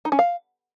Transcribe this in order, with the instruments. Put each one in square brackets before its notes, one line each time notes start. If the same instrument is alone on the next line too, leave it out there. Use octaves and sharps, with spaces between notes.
[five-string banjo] D#4
C#4
F5